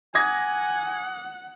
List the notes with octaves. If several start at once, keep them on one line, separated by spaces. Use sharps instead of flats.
F#5 G#5 D6 D#6 G#6 A#6